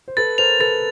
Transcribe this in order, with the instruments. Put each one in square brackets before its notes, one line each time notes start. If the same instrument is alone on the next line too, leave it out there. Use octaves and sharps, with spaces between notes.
[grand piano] C5
[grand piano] A4 B4 [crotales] A6
[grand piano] A#4 C5 [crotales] F7
[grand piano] A4 B4 [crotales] A6